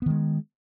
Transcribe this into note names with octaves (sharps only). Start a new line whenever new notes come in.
D#3 G#3 B3